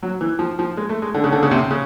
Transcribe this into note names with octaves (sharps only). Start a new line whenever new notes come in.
F#3
E3
F3
F3
G#3
A3
G#3
D3
C#3
D3
C#3
C3
C#3